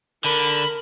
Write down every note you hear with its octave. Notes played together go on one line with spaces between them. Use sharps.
D3 A#4 B5